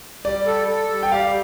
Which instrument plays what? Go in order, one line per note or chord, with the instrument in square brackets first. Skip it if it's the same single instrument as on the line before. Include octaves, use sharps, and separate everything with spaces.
[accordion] G3 [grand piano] D5
[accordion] A4
A4
G3
[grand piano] G5
[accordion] G4 [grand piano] F5